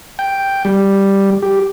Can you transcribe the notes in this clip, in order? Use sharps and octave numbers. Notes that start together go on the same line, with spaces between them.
G5
G3
G4